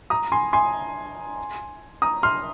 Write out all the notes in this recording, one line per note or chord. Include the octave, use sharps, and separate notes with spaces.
A#5 D#6
G#5 C6
G#5 C6
A#5 D#6
C6 F6